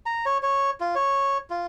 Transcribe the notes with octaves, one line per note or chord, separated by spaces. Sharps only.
A#5
C#5
C#5
F4
C#5
F4